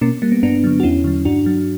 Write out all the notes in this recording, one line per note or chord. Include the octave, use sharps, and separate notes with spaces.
B2 A#3 C#4
G3 A#3
B3
G2 B3 D4
D3 F#3
F#4
E2 C#4 E4
D3 F#3
G2 D4 F#4
F#3